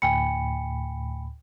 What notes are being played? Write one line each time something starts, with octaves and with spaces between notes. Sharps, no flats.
D2 A2 G5 G#5 B5 C#7